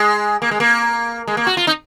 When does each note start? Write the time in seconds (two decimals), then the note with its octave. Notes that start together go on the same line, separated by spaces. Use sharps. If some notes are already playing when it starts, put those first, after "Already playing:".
Already playing: G#3
0.42 A#3
0.51 G#3
0.60 A#3
1.27 G#3
1.37 A#3
1.47 F#4
1.57 F4
1.67 D#4